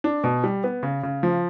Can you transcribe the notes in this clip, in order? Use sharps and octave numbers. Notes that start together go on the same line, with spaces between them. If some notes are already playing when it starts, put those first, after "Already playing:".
D4
B2
G3
B3
C#3
C#3
F3